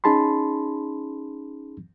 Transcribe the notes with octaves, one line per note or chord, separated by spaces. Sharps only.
C#4 D#4 G#4 A5 B5 C6